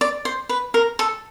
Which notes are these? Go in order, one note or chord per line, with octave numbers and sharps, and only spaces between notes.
D5
C5
B4
A#4
A4